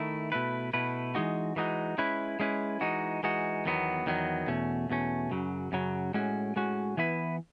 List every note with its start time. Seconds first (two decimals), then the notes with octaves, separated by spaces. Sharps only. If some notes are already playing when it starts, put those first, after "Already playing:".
Already playing: D#3 A3 E4
0.32 B2 A3 E4 B4
0.73 B2 A3 E4 B4
1.15 E3 G#3 D#4 F#4
1.56 E3 G#3 D#4 F#4
1.98 G#3 C#4 E4 B4
2.40 G#3 C#4 E4 B4
2.81 E3 G#3 D#4 F#4
3.23 E3 G#3 D#4 F#4
3.65 E2 D#3 F#3 B3
4.06 E2 D#3 F#3 B3
4.47 E2 B2 A3 C#4
4.90 E2 B2 A3 C#4
5.31 F#2 C#3 F#3
5.72 F#2 C#3 F#3
6.14 A2 G#3 C#4 F#4
6.56 A2 G#3 C#4 F#4
6.97 E3 B3 E4 B4